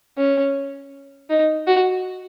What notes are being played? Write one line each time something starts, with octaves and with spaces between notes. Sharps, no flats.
C#4
D#4
F#4